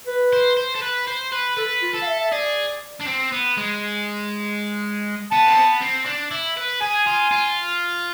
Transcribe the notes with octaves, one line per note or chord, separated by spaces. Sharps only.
B4
C5
C5
A4
B4
C5
B4
A4 B4
F4
A4
F5
E5
E5
G#4 D5
D4
C4
B3
G#3
B3 A5
C4
B3
C4
D4
E4
B4
G#4 G#5
F4
F4